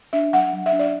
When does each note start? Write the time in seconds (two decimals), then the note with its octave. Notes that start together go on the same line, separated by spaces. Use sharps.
0.13 D4 E5
0.33 F#3 F#5
0.53 F#3
0.66 E5
0.72 D4
0.79 D5